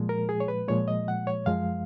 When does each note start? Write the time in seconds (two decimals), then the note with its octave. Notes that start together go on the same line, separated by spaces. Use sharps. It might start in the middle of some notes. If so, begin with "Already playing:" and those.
Already playing: A#2 F3 G#3
0.09 A#4
0.29 G#4
0.40 C#5
0.48 B4
0.68 A#2 F3 G#3 C#5
0.88 D#5
1.08 F#5
1.27 C#5
1.46 F#2 F3 G#3 F5